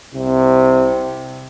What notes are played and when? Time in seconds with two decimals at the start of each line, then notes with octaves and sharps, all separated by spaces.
0.13 C2 C3